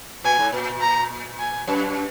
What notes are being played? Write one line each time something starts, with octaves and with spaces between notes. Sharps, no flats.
A#2 G#5
G#2
A#2
A#5
G#5
F#2